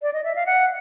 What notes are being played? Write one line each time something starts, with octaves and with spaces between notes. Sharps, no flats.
D5
D#5
E5
F5
F#5